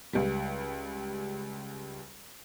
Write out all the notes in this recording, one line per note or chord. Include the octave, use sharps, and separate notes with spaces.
C#2 G3